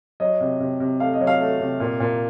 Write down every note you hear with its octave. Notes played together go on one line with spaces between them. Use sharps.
F#3 D#5
C3
C3
C3
A3 F5
D#5
F#3
F5
A3
C3
A#2
A#2